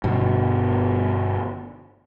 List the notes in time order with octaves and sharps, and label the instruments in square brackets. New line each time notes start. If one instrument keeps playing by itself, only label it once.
[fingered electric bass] G1 B2